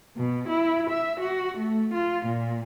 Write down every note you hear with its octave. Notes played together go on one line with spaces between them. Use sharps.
B2
E4
E5
F#4
A3
F4
A#2